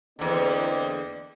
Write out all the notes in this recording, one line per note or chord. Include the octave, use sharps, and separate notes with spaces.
E2 D3 A#3 C4 D#4